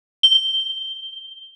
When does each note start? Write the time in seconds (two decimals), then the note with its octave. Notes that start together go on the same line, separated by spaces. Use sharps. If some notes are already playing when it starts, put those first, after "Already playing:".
0.23 G7